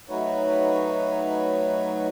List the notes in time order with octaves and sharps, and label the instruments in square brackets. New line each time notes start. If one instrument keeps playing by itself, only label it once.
[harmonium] F#3 A3 D#4 F#4 B4 C#5